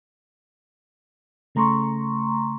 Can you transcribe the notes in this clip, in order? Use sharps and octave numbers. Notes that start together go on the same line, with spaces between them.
C#3 A3 A#5 C6 C#6